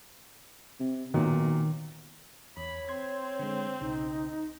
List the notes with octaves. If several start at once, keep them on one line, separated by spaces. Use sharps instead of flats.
C3
B1 A#2 D#3 F#3
E2 C#5 B5
C4 C6 G#6
D3 G#3
B1 C#3 D#4